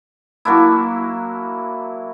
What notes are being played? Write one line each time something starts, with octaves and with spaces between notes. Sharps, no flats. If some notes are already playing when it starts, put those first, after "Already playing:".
F#3 A#3 D4 E4